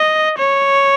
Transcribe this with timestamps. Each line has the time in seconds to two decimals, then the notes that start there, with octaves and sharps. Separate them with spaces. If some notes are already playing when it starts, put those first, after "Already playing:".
Already playing: D#5
0.38 C#5